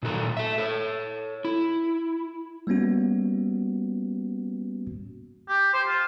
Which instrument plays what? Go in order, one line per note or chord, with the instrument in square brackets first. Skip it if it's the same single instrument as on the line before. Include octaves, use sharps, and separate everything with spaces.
[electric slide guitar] A#2 D#3 F#4 A4
A4 E5
A4 C#5
E4
[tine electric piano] G3 A#3 B3 C#4 F#4
[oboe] G4
C5
F4